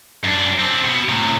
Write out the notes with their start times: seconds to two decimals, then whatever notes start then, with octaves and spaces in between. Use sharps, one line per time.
0.24 F#2 D4
0.60 C4 D4
0.85 B2
1.09 A2 C3